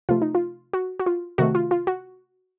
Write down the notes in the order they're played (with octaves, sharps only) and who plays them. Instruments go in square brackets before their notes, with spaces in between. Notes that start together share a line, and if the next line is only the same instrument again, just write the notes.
[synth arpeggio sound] C3 F3 A3 F4
D#4
F4
F#4
F#4
F4
C3 D#3 A3 F#4
F4
F4
F#4